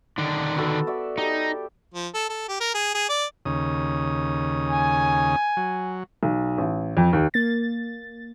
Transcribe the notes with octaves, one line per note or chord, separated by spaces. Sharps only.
D3 D#3 D4
B3 F#4 A4
F#4 D5 E5
D#4 G4 A4
F3
A4
A4
G4
A#4
G#4
G#4
D5
D#2 C#3 D#6
G#5
F#3
B1
A1
F2
D#2
A#3 A6